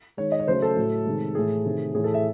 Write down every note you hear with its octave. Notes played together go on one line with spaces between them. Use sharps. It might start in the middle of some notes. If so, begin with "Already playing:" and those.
D#3 G#3 C#5
D#5
C#5
C#3 F#3 A3 C5
A4
A2 F#3 A3
C3 D#3 G#3
A2 E3 A3 G#4
C3 D#3 A3
A2 E3 A3 G#4
A4
E5